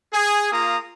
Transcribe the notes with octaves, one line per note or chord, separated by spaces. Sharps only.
G#4
A#3 F4 A#5 D#6